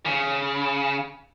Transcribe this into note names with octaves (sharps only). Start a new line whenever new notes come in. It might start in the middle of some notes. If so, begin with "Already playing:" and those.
C#3